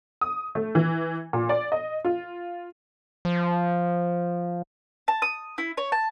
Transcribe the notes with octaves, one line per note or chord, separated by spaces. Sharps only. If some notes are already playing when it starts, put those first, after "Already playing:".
D#6
A3
E3
A#2
D5
D#5
F4
F3
A5
D#6
E4
C#5
A5